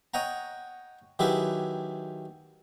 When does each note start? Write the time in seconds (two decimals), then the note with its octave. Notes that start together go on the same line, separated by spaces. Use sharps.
0.14 C#5 D#5 F#5 G5 A#5
1.19 D#3 F#3 E4 G4 G#4 B4